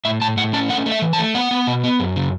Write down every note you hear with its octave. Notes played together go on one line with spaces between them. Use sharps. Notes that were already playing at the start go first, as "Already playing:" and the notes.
A2 E5
A2 A5
A2 F#5
C#4 A5
A3 F#5
A3
E5
E3
A5
A3
B3 F#5
B3
B2
B3
F#2
C#3